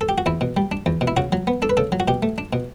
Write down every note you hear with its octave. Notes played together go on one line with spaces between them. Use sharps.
A4
G4
F#4
E2 E4
B2
G3
D4
E2
B2
E4
C#3 F#4
F#3
B3
D4 A4
B4
C#3 A4
F#3
F#4
B2 G4
A3
D4
B2